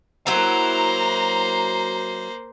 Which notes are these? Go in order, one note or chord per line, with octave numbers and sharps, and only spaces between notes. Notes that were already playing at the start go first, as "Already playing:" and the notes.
F#3 A#3 E4 C5 A#5